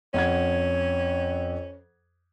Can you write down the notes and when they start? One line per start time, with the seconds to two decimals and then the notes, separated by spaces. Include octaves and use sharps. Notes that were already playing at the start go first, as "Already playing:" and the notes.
0.14 F2 C#4 F#5 G#6